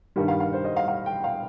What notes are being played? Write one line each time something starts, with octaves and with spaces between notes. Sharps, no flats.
G2 D#3 G3
F5
F5
C5
D#5
F5
F5
G5
F5